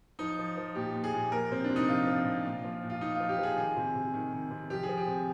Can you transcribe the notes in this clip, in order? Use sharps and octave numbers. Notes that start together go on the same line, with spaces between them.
F3 D#4
F3
F3
A#2 G4
A#2
G#4
A#2
F3 A#4
C3 C4
C3 D4
D#4
F3 F4
F3
C3
A#2
F3
A#2
F4
A#2 D#4
F4
F3
G4
F3 G#4
D#3 G#4
C3
C3
D#3
D#3
C3
F3 G4
G#4
F3
G4
C3